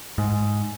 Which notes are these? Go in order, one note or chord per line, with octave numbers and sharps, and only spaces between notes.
G#2